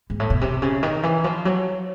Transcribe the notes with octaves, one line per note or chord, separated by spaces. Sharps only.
G#2
A2
B2
C3
C#3
D#3
E3
F3
F#3